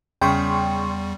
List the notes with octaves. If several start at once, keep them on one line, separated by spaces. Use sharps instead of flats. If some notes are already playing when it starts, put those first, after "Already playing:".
E2 C#3 G3 G5 C6 C#6